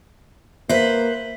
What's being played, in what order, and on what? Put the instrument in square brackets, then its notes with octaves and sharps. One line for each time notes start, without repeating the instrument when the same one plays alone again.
[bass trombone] A#3 [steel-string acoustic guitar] B4 C5 [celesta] E5 B6